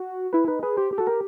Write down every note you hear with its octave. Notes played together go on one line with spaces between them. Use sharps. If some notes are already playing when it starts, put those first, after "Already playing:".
Already playing: F#4
E4 B4
D#4 B4
G#4 B4
G4 C5
G4
F#4 A4
G4 A#4